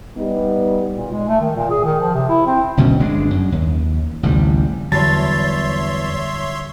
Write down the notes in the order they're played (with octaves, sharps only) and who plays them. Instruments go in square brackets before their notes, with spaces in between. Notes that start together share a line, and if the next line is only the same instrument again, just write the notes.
[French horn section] G3 B3 D#4
[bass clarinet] A#2
G#3
A3
D#3
A#2
G#4
D#3
F3
C3
E4
C4
[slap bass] F#1 D2 B2 C#4
G1 G#3 D4
F#2
D#2
A1 D2 C3 G3
[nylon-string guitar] E2 [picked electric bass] D3 F#3 G3 [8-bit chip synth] C#5 E5 C6 [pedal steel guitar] A5